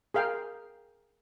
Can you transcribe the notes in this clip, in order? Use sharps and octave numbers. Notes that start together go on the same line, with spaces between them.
G#4 A#4 F5 G5